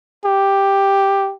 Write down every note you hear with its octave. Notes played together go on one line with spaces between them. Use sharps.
G4